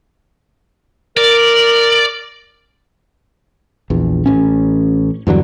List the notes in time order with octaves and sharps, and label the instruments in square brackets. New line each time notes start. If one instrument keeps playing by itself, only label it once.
[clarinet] A#4 [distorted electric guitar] D5
[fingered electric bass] A#1 E2
A1 C#4
E2 G2 D3 F#3